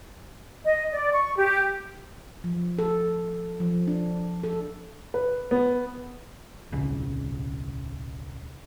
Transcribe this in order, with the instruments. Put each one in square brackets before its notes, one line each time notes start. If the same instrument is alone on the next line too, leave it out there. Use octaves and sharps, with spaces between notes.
[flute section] D#5
D5
C#6
G4
[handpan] F3
A4
F3
D4
A4
[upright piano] B4
B3
[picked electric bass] D1 B1 C#3